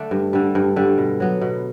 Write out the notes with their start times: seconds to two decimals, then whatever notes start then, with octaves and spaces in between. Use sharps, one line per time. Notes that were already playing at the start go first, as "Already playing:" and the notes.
Already playing: D3 A3 D4
0.11 G2
0.33 D3 G3
0.55 G2
0.76 D3 G3
0.98 B2
1.20 F#3 B3
1.41 B2